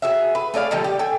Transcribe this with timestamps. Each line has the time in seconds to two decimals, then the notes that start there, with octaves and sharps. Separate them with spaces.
0.02 F#4 G#4 E5
0.35 B4
0.54 A3 G#4 D5 F5
0.71 A#2 D3 F3 G3
0.84 G4
0.99 A4 G5 G#5